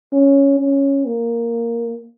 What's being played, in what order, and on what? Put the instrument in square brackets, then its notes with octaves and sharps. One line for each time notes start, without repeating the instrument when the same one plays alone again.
[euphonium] C#4
C#4
A#3